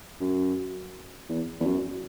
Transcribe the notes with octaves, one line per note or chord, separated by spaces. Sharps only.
F#2
E2
E2
F#2